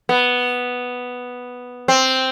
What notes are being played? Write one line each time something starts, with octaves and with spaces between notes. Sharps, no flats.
B3
C4